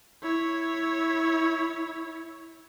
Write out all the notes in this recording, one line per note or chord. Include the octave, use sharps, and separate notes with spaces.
E4 C#5